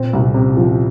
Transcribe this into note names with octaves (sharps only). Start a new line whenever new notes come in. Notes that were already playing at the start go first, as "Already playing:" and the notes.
Already playing: A#2 C4
C2
C3
F3